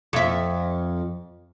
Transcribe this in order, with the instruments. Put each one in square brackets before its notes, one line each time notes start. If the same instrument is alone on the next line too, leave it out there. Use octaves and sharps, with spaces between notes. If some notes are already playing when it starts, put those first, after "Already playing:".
[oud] F2 E5